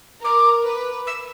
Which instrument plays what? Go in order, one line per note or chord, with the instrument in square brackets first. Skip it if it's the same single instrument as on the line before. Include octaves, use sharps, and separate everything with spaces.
[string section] A#4 [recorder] D6
[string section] B4
[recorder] E6